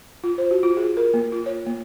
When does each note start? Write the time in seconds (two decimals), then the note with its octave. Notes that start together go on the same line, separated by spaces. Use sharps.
0.24 F4
0.38 C5
0.51 F#4
0.63 F4
0.77 G#4
0.97 A#4
1.14 A#3
1.32 F4
1.46 C#5
1.66 A#3